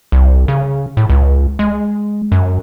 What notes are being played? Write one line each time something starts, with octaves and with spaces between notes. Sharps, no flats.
C2
C#3
A2
C#2
G#3
F#2